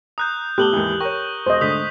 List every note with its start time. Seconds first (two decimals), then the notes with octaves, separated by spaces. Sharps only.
0.18 A#5 D#6 F#6 G6
0.58 A2 B3 G4 A4 F#6 F#7 G7
0.73 D#2 G#2 E3
1.00 A#4 C#5 G5 C#6
1.46 E1 C5 D#5
1.61 D2 G#2 D3 D#6 G6 B6